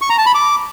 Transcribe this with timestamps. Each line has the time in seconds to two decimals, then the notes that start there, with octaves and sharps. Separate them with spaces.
0.01 C#6
0.10 A#5
0.18 A5
0.26 B5
0.35 D6